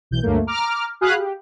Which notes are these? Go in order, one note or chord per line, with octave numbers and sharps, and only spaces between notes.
B1 E3 G6
D2 G2 F#3 A3 A#3
A#5 D6 F6
F#4 G#4 F5 B5 D#6 F#6
G4